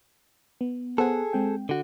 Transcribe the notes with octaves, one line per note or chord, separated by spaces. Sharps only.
B3
B3 G#4 A4 C5 F#5
G#3 C4 G5
D3 F#4